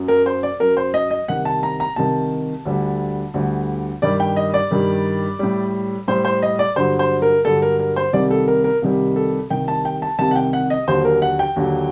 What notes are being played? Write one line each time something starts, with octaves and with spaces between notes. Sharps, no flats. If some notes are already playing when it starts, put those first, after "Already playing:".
Already playing: F#2 F#3
A#4
C5
D5
F#2 F#3 A#4
C5
D#5
D#5
C2 C3 D#3 F#5
A5
A#5
A#5
C2 C3 D#3 A5
D2 D3 G3
D2 D3 G3
G2 D#3 G3 D5
G5
D#5
D5
G2 D#3 G3
A2 G3
A2 G3 C5
C5
D#5
D5
G2 D3 F#3 C5
C5
A#4
G2 D3 F#3 A4
A#4
A#4
C5
C2 C3 D#3 G3 D5
A4
A#4
A#4
C2 C3 D#3 G3
A4
C2 C3 D#3 G5
A5
G5
A5
C2 C3 D#3 A5
F#5
G5
F#5
D#5
D#2 D3 F#3 C5
A#4
F#5
G5
D#2 D3 F#3